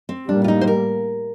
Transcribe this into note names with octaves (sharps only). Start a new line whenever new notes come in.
C4
A2 G3 A#3 D4
F4
D#4
C5
A#4